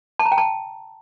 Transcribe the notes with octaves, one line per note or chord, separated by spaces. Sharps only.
A5
A#5
G5
A5